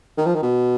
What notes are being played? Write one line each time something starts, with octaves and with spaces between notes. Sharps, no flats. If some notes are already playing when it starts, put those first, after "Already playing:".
D#3
F3
D#3
B2